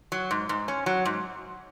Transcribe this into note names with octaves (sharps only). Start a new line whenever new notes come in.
F#3
G#2
G#2
C#4
F#3
G#2